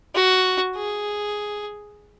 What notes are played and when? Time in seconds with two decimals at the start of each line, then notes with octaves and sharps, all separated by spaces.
0.15 F#4
0.76 G#4